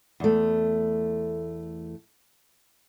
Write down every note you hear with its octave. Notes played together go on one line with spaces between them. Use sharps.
E2 A3